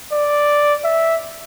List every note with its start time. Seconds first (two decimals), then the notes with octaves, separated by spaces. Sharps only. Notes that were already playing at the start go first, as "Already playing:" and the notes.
0.12 D5
0.84 E5